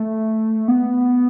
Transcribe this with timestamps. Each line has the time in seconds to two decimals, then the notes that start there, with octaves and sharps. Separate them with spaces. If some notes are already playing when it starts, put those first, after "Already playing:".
Already playing: A3
0.68 B3